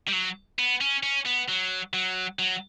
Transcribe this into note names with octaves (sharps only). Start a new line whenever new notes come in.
G3
F#3
B3
C#4
C#4
B3
F#3
F#3
F#3